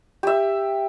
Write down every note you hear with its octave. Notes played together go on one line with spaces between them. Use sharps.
G4 E5